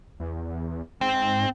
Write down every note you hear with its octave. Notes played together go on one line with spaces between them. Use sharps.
E2
G#2 C4